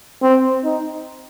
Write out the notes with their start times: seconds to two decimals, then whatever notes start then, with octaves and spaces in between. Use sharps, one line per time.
0.22 C4
0.64 D#4